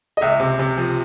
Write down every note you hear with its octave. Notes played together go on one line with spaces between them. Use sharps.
D#5
C#2 E5
C3
C3
F3